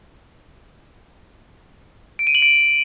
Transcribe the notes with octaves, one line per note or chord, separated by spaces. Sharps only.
D7
D#7
F#7
D7